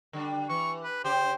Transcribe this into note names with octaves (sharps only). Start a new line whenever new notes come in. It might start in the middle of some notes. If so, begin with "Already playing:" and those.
D3 G3 D4
E3 C#6
B4
C#3 G4 C5